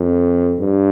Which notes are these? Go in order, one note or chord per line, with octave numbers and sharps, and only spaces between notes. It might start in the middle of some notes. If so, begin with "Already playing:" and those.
Already playing: F2
G2